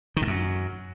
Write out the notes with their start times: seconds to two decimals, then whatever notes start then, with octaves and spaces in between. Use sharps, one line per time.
0.16 D#3
0.22 G#2
0.27 F#2